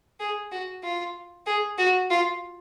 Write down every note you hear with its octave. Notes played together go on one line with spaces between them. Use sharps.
G#4
F#4
F4
G#4
F#4
F4